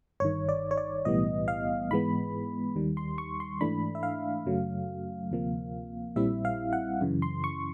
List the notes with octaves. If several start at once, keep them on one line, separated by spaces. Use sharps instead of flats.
G1 G2 D#3 C#5
D5
C#5
D5
B1 A2 E3 G3 B3 D#5
F5
G#2 E3 G#3 B3 B5
D#2 D#3 G3
C6
C#6
C6
G#2 E3 A3 D4 B5
E5
F5
F#2 C#3 F#3 A3
D2 C3 F3 A#3
A#1 A#2 G3 C4 E4 E5
F5
F#5
F#2 C#3 E3
C6
C#6